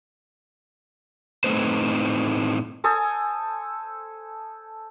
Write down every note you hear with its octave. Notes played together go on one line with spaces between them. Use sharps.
A2 A3 C4 D#4 B4 C5
A4 C5 G#5 D#6